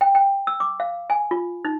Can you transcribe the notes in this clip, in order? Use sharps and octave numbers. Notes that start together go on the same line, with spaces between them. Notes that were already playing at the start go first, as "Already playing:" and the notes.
G5
G5
E6
D6
F5
G#5
F4
D#4